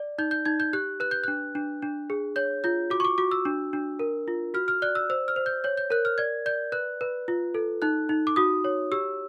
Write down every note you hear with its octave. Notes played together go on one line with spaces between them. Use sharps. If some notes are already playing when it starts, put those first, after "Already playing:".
Already playing: D5
D#4 G6
G6
D#4 G#6
G6
G4 F#6
B4 F#6
G6
D4 F#6
D4
D4
G#4
C#5 G6
F4 G6
F#4 D6
C#6
D6
F#4 D6
E6
D4
D4
A#4
F4
F#4 F6
F6
D5 F#6
E6
C5 E6
F6
C5
G6
C#5 G6
G6
A#4 F#6
F6
D5 G#6
D5 G6
B4 F#6
B4
F4
A4
D#4 F#6
D#4
D6
F#4 D#6
C#5
G4 E6